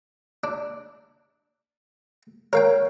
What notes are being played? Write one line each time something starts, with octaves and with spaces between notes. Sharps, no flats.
D4
A#4 C#5 F5 G5